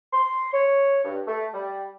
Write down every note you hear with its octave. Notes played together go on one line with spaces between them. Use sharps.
C6
C#5
G2
A3
G3